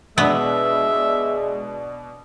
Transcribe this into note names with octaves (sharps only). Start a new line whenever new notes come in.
B2 G#3 B3 D4 E5